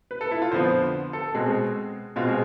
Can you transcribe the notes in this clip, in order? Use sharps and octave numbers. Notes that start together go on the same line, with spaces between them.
B4
A4
E4
F4
F2 D3 F3 B3 C5
A4
B2 G#3 C4 G#4
B2 G#3 C4 F4
G#4